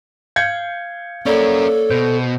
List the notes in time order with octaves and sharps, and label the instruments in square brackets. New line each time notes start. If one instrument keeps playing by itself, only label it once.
[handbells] F5 [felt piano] G6 G#6 C#7
[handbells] A#3 C#5 [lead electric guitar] C#4 A#4 [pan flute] A4 [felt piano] D5
[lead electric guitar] B2 [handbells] C5